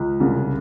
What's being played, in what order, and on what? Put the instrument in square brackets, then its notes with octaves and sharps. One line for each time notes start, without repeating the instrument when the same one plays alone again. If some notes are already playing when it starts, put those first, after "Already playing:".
Already playing: [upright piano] C#2
[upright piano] C2 [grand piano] C#3